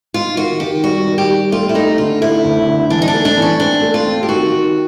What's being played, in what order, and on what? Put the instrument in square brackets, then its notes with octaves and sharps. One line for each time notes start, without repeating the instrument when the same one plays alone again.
[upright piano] D#4 [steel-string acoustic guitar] F4
[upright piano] D#3 [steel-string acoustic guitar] F#4
[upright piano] D#3 [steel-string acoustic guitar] G4
[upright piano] G3 [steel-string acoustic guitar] F#4
[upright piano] D#3
[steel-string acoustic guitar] G4
[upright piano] G3
[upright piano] A3 [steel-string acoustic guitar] F4
[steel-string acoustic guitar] E4
[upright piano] A3 [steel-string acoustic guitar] D#4
[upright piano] D3 [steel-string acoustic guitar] F4
[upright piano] A3 [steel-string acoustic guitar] E4
[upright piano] D2
D3
[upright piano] E3 [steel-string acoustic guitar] D4
[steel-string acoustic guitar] D#4
D4
[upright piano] A3
[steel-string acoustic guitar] D4
[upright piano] E3
[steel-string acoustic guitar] C#4
[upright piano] C4 [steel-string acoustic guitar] D4
[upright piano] A3
[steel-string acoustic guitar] F4
[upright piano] C4
[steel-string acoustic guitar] G4
[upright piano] D#3 [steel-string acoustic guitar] F#4
[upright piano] D#3